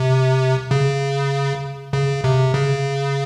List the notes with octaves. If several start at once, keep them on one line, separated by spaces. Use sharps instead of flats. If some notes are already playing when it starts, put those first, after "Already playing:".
Already playing: C3
C#3
C#3
C3
C#3